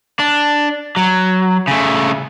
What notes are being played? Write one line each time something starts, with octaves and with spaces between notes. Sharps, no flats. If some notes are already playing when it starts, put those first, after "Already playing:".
D4
F#3
C#3 A3